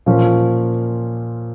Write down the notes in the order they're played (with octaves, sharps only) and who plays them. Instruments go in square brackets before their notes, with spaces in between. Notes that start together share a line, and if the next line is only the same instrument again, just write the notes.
[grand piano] A#2 F3 A#3 C#4